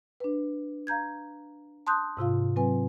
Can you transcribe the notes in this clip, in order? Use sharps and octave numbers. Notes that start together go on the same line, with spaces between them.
D4 B4
F5 A#5 G6 G#6
A5 C6 D#6 F#6 G6
G#2 C3 F4 F5
F#3 C4 B4 G#5